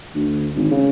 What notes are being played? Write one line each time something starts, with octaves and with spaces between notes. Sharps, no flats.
D2
G#1
C#3